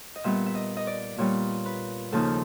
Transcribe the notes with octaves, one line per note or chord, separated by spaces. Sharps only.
D#5
A#2 G3 B3 E5
E5
D#5
D#5
D5
A#2 G3 B3 C#5
B4
D#2 C#3 F3 A#3 D#4 A4